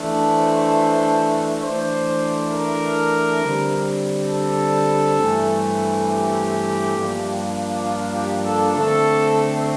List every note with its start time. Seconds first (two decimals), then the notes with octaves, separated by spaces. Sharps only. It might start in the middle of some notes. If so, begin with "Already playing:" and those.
Already playing: E3 A3 D4
0.29 C5
1.62 E3 A3 D4 C5
2.51 A#4
3.41 D3 G3 C4
4.28 A4
5.18 G2 E3 A3 C4
6.06 G4
6.96 G2 F3 A#3 D4
7.84 F4
8.15 G4
8.44 A4
8.74 D3 A3 C4 A4